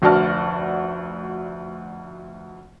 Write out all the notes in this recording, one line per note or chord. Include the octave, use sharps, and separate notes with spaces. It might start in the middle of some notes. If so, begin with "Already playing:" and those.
F1 D2 F#4 D5 A5 F6